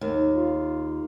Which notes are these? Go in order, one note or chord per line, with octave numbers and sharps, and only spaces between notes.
D#2
F4